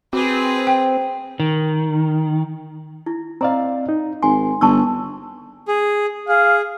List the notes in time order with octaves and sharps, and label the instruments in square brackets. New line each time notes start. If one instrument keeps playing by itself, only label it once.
[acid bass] C4 [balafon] F#4 [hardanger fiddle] G#4 B4
[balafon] G5
[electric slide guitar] D#3
[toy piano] E4
[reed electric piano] C4 D5 F5 [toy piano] D#5 A#5
[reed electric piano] D#4
[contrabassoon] G#1 [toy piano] G#5 [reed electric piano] C6
[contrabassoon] G1 [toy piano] A5 C#6 E6
[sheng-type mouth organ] G#4
[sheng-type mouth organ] G#4 [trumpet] F5